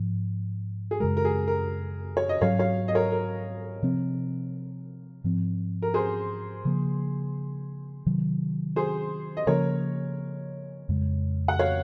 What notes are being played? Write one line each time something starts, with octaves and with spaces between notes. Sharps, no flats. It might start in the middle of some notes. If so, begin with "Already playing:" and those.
Already playing: G#2 F3
G#4
F#2 C#3 G#3 A#4
A#4
G#4
A#4
C#5
D#5
G#2 F#3 C#4 C#5 F5
C#5 F5
D#5
A#4 C#5
A#4
C3 F3 C4
G#2 F3 C4
A#4
G#4 C5
C#3 F3 A#3
C3 D#3 F#3
G#4 C5
D#5
C#3 F3 A#3 C#4 A#4 C#5
F2 C#3 G#3
F#5
C#5 F5